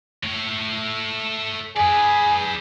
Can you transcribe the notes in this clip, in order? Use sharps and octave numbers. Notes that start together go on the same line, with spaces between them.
A3 C#5
G#4 B4 D5